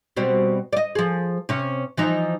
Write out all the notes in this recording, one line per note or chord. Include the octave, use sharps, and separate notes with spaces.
B2 G3 C4
D5 D#5
F3 G#4
C3 C#4
E3 F3 D#4